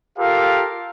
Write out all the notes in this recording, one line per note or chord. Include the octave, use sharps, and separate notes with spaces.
F4 G4 A4 A#4 F5